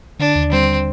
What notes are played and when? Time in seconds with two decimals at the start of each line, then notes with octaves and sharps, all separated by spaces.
0.19 D3 D4
0.35 D#2
0.52 G3 C4